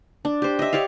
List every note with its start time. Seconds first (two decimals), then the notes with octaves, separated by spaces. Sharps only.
0.25 D4
0.42 G4 C5
0.59 D#5 E5
0.73 G4 C#5 D5 F5